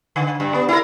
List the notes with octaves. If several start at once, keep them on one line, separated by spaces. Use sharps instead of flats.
D3
G2
B3
E4 A#4